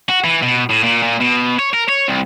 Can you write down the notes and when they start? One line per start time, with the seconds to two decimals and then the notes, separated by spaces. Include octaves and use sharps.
0.09 F#4
0.24 E3
0.42 B2
0.70 A2
0.84 A#2
1.03 A#2
1.21 B2
1.59 C#5
1.74 A#4
1.89 C#5
2.08 C2